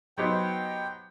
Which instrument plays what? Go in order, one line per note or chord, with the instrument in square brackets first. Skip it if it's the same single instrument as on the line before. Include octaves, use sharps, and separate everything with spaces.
[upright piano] F#3 B3 D#4 G4 C5 [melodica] G5